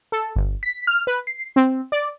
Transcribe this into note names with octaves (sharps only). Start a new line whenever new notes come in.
A4
G1
B6
F6
B4
C7
C4
D5